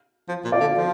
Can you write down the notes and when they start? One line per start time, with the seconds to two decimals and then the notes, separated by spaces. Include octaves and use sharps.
0.28 F3
0.44 A#2
0.52 D5 F5
0.60 D3
0.77 F3